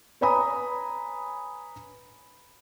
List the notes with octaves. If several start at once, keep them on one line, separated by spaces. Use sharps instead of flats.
B4 C#5 G#5 A#5 B5 D#6